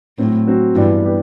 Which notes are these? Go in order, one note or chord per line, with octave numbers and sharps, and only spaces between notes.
A2 F#3 C4 F#4
F#3 C4 F#4
G2 E3 G3 B3 D4 G4
B3 D4 G4